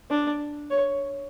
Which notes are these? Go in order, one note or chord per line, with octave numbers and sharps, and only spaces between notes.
D4
C#5